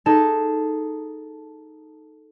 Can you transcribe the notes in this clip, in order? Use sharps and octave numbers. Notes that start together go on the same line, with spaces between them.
D#4 G#4 A4 A5